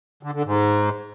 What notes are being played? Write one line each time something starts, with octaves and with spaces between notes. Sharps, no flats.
D3
D3
G#2